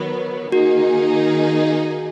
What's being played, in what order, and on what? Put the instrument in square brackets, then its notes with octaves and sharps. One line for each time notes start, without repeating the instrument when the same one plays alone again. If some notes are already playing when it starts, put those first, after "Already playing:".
Already playing: [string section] D#3 F#3 B3 [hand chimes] A#4
[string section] D#3 A#3 D#4 G#4 [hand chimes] F#4